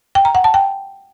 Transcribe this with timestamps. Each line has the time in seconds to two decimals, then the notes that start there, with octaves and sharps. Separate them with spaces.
0.15 G5
0.25 A#5
0.35 F#5
0.44 A5
0.54 G5